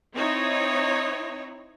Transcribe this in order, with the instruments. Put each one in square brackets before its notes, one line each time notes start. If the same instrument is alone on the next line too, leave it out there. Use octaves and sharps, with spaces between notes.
[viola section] C4 D#4 E4 C#5